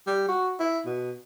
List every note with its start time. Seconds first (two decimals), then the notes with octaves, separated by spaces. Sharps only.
0.07 G3
0.28 F#4
0.60 E4
0.86 B2